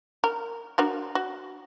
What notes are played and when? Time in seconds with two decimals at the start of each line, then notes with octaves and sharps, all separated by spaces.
0.24 A#4
0.78 D4 F#4 A#4
1.15 F#4